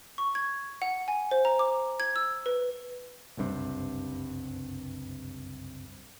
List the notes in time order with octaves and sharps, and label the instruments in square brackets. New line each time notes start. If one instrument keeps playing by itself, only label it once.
[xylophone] C#6
G#6
F#5
G#5
C5
A#5
D6
G#6
E6
B4
[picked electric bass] F#1 C2 G2 C3